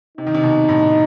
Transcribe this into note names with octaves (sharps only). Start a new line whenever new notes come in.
C3 D#4
D#3
C3
B2
A2